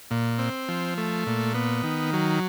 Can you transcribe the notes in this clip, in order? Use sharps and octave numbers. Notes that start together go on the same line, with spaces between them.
A#2
C4
F3
A3
A#2
B3
D#3
F#3